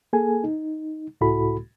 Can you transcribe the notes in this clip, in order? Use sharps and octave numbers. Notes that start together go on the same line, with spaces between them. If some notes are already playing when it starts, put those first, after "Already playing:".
A#3 G#4 A4 G#5
D#4
C#2 A2 E4 F#4 A4 B5